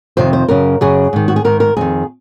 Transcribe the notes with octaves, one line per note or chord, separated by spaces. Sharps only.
F2 C3 D#3 C5
C5
F#2 C#3 A#4
F#2 C#3 G#4
G#2 D#3
F#4
G#4
G#2 D#3 A#4
A#4
F2 D#3 G#4